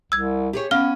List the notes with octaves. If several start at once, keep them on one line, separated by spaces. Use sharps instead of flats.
C2 E6 G#6
G4 G#4 C#5
B3 C#4 F5 F6 G7